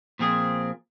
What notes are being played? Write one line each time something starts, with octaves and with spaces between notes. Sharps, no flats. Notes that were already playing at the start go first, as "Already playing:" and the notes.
A#2 F3 C4 G#4